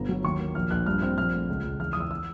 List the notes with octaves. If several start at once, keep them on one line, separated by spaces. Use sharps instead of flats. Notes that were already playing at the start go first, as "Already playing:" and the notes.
Already playing: G1 B3 A#5
F#3
D#2 C#6
A#3
A#1 F6
A#1 F#6
G2 F6
C4 F6
A#1 F6
A3
C#2
C#2
E2 F6
D#6
E2 E6
E6